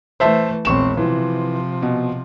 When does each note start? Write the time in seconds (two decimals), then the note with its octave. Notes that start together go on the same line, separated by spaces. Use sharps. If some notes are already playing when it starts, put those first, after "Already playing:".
0.20 E3 A3 C5 E5 A5
0.65 E1 A#1 C4 C#6 E7
0.97 C3 E3 F3
1.82 B2